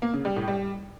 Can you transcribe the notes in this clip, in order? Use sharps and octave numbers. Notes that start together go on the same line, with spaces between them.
A#3
C#3
G3
A2
G3